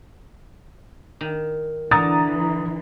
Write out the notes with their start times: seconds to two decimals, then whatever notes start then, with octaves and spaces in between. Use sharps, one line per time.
1.21 D#3
1.91 D3 E3 A#5 D#6 A6